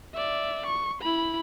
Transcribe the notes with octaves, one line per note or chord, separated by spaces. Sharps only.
D5 E5
C#6
E4 B5